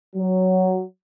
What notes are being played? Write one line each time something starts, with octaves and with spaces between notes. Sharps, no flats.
F#3